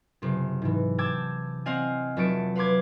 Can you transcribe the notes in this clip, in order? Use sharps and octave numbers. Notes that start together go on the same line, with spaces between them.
F#1 C3
G#2 E3
G5 A5 D6 E6 G6 G#6
C4 D#5 F5 F#5 G#5
F1 F#3 E5 A5 C#7 D7
B4 F5 C6 D6 G#6